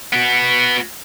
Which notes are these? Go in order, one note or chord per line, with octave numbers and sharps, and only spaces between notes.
B3 F#4